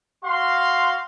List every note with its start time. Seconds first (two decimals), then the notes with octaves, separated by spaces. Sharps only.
0.25 F#4 F5 C6